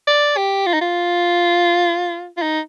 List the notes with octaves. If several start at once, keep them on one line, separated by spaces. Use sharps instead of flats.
D5
G4
F4
D#4
F4
F4
D#4